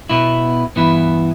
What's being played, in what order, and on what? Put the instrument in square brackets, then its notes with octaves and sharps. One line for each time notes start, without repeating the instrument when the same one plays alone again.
[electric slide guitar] B2 B3 E4
G2 E3 B3 E4